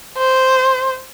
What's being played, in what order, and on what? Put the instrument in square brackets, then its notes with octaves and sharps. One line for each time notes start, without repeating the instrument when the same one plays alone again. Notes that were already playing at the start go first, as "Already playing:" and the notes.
[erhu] C5